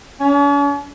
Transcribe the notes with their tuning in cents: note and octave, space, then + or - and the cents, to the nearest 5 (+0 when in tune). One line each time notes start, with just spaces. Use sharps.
C#4 +45